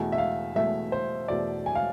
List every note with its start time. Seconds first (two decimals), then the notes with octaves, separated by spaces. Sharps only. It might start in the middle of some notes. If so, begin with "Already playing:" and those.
Already playing: E2 B2 A3 G#5
0.12 E5
0.18 F5
0.56 E2 B2 A3 E5
0.92 C5
1.28 E2 B2 A3 D5
1.66 G#5
1.75 F5